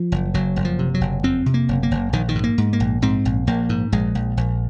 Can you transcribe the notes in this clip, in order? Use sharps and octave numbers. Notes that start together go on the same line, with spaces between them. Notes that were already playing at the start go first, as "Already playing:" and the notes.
Already playing: F3
F#1
F#1 F#3
F#1
F3
C3
F#3
F#1
F2 C4
C3
A#3
F#1
A#3
F#1
A#1 D#3
D#3
G#2
A#3
G#2
A#3
A#1
G#2 C4
A#1
A#1 A#3
G#2
A#1 G#3
A#1
A#1